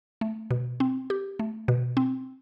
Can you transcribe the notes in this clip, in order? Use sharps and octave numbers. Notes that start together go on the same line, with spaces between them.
A3
B2
C4
G4
A3
B2
C4